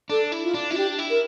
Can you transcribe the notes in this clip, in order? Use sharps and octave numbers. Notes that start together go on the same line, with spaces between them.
D4 A4
E4
F4
D4
E4 F4
D4 G4
E4
A#4